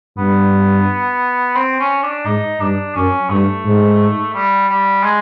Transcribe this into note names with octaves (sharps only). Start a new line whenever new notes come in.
G2 B3
C4
C#4
D4
G#2 D#4
G2 D4
F#2 C#4
G2 A3
G#2
G3
G3
G#3